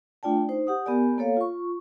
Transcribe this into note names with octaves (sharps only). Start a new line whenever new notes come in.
A3 D4 F4 D5 G5 A5
D#4 C5
G4 F#5 D#6
B3 G4 A#4 D5 G#5
A#3 A4 C#5 F5
F4 C#6